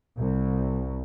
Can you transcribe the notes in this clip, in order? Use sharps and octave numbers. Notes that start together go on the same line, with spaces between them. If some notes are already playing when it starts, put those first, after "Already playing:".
C2